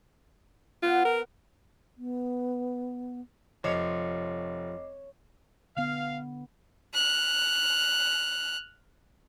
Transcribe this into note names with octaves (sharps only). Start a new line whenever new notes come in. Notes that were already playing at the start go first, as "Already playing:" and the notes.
B3 F4 F#5
A#4
B3
F1 F3 C#5 D#5 D6 C7
D3 B3 F5
F6 F#6